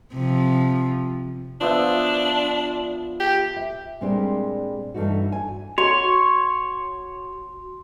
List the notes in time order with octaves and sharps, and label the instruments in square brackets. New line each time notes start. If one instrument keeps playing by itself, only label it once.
[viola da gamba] C3 F3
[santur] F3 B3 E5 [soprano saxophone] D4
[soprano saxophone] G4
[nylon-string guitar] E5
A#2 G3 G#3 C4 D4 G4
G2 E3 A3 D#4 F#4
G#5
[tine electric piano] F#4 [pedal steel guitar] C#5 [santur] C6